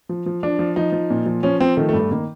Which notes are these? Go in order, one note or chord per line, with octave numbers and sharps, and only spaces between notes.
F3
F3
F3 D4
F3
F3 D#4
F3
A#2
F3
F3 C#4
F3 C4
D#3 A3
A3
G2
A3
D#3 A#3